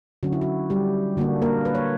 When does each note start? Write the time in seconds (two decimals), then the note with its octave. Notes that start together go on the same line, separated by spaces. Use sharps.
0.23 D3 F#3 C#4 F#4
0.32 E4
0.41 F#4
0.70 G3 G4
1.17 D3 A#3 D4 F#4
1.42 A#3 A#4
1.65 B4
1.75 C#5